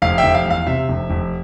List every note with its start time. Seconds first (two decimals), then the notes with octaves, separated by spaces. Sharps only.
0.02 F1 F5
0.18 E5 G5
0.23 F1
0.35 F5
0.46 E2
0.51 F5
0.67 C3 E5
0.89 F1
1.10 F1